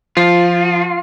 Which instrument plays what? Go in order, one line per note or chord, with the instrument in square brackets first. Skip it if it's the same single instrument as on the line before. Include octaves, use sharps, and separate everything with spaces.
[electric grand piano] F3 [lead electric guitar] F4